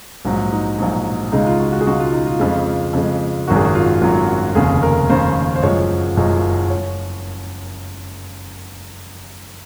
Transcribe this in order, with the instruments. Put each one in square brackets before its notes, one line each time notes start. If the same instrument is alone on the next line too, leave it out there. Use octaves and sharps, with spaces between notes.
[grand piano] A#1 G#2 F#3
D#4
A#1 G#2 F#3
C#2 C#3 G#3 D#4
F4
F#4
F#4
G#4
C#2 C#3 G#3 F#4
F4
D#4
F4
F2 C#3 G#3
F2 C#3 G#3
G#1 F#2 D#3 F#3 F#4
G#4
F#4
F4
G#1 F#2 D#3 F#3 F4
F#4
F1 D#2 C#3 G#4
A#4
F1 D#2 C#3 C5
C5
F#1 F#2 F3 G#3 C#5
F#1 F#2 F3 G#3
C#5